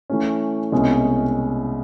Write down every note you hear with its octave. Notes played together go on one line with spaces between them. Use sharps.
E3 A3 C#4
C2 B2 G#3 C#4